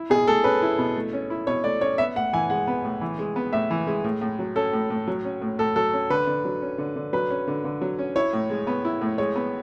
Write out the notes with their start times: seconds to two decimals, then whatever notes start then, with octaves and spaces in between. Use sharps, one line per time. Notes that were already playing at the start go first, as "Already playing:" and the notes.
Already playing: E4
0.10 B2 G#4
0.27 A3 A4
0.44 C#4 B4
0.62 E4
0.78 B2
0.96 A3
1.13 C#4
1.30 E4
1.47 B2 C#5
1.64 A3 D5
1.81 C#4 C#5
1.98 B3 E5
2.16 A2 F#5
2.33 E3 G#5
2.50 G#3 F#5
2.67 B3
2.84 A2
3.01 E3
3.19 G#3
3.36 B3
3.53 A2 E5
3.71 E3
3.87 G#3
4.04 A2
4.21 A2
4.39 F#3
4.56 C#4 A4
4.73 A2
4.90 A2
5.08 F#3
5.24 C#4
5.42 A2
5.59 A2 A4
5.76 F#3 A4
5.93 C#4
6.10 D3 B4
6.27 D3
6.45 F#3
6.62 C#4
6.78 D3
6.96 D3
7.13 F#3 B4
7.30 C#4
7.48 D3
7.64 D3
7.82 F#3
7.99 C#4
8.16 E4 C#5
8.33 A2
8.50 G#3
8.67 B3
8.85 E4
9.01 A2
9.18 G#3 C#5
9.36 B3